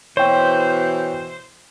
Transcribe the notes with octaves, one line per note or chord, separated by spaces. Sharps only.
B2 E3 C5 C#5 G5